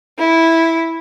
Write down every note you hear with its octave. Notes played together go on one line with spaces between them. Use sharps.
E4